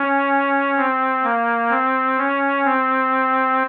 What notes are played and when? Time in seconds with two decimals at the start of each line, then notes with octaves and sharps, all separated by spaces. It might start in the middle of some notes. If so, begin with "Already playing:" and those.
Already playing: C#4
0.77 C4
1.24 A#3
1.70 C4
2.18 C#4
2.65 C4